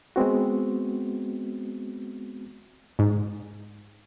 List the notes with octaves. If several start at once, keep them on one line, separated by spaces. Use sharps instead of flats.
G#3 B3 C4 F#4
G#2